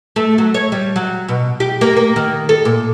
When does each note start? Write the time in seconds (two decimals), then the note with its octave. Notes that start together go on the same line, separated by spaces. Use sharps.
0.16 A3
0.38 F#3
0.54 C#5
0.72 G3
0.96 F#3
1.28 B2
1.60 G4
1.81 A#3
1.97 A#3
2.16 D#3
2.49 A4
2.65 A#2